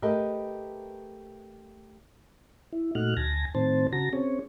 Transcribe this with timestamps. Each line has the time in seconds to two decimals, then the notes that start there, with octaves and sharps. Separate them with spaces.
0.02 A3 G4 A#4 B4 D#5 E5
2.73 E4
2.95 A#2 A3 D#4 F#4 F6 F#6
3.17 D2 G#5 A5 A#6
3.55 A2 D#3 C4 C5 A5
3.93 C#3 F#4 A5 A#5 A#6
4.13 C4 C#4 G#4 C#5